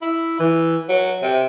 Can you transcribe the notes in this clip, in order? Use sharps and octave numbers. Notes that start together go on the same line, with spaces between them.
E4
E3
F#3
C3